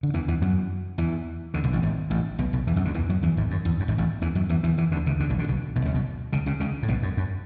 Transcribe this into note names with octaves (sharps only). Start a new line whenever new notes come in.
D3
E2 E3
E2 E3
F#2 F#3
E2 E3
D2 D3
B1 B2
A1 A2
G#1 G#2
A1 A2
B1 B2
B1 B2
E2 E3
F#2 F#3
D2 D3
E2 E3
F#2 F#3
E2 E3
G#1 G#2
F#2
E2
F#2
G#1 G#2
A1 A2
E2 E3
F#2 F#3
E2 E3
E2 E3
E2 E3
D2 D3
C#2 C#3
D2 D3
B1 B2
D2 D3
B1 B2
B1 B2
C#2 C#3
B1 B2
C#2 C#3
C#2 C#3
C#2 C#3
A2
B1 B2
F#2
F#2